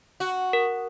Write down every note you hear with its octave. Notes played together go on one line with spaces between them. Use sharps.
F#4
A#4